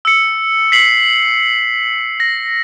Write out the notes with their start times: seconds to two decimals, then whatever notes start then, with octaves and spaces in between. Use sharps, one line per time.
0.05 E6 C#7
0.72 B6 C7 F#7
2.20 A#6